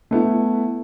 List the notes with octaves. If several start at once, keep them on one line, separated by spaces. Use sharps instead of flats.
A3 B3 E4